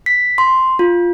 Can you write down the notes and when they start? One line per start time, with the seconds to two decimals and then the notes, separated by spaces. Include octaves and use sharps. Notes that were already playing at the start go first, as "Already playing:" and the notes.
0.06 B6
0.38 C6
0.79 F4